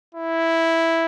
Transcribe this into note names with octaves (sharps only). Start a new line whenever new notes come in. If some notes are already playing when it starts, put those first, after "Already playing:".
E4